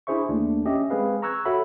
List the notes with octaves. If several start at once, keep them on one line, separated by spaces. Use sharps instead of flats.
D4 E4 G#4 C5 E5 C#6
D#2 A3 D4
C#4 G4 D#5 E5
G#3 C4 G#4 B4 F5
A#5 C#6 E6 F#6 G#6
F#4 A4 C#5 E5 F#5 B5